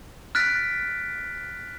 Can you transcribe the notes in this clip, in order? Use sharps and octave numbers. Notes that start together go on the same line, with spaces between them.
F6 F#6 A6 B6 D7